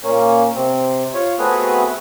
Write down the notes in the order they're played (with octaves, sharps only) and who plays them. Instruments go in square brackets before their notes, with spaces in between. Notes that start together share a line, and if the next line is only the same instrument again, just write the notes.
[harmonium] A#2 A#3 C#4
C3 C4
F4 C#5
A3 B3 C4 F#4 G#4 B4